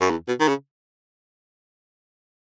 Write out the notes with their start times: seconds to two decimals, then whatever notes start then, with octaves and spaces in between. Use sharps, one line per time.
0.01 F#2
0.10 E2
0.28 B2
0.40 D#3
0.48 C#3